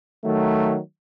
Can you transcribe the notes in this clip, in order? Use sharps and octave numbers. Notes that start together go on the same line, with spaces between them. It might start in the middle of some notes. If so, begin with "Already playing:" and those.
D#3 F#3 A3